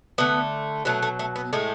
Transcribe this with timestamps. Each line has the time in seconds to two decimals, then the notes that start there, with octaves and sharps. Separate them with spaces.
0.18 D3 A3 B3
0.85 B2 F#3 A3 B3
1.02 A3
1.19 A3
1.36 B3
1.53 A2 G#3 A3